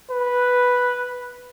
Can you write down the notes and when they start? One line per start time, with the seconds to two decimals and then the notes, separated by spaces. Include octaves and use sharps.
0.10 B4